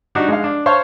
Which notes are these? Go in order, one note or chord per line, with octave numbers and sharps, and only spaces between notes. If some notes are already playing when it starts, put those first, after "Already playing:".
G3 D4 D#4 F#4 G4
G#3 F5
D4
C5 C#5 F5 A5 C6 C#6